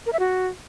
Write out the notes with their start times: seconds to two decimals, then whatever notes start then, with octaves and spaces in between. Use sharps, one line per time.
0.06 A#4
0.13 E5
0.19 F#4